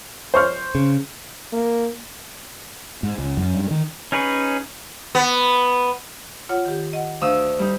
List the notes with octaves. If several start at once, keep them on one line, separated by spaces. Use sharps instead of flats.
C5 C#6 F6
C#3
A#3
G#2
C#2
F#2
G2
D#3
C#4 D#4 G#4 B4 C#5
B3
F4 C#5 F#5
D#3 G4
D#5 F#5
D2 F5 D#6 E6
G3 D#4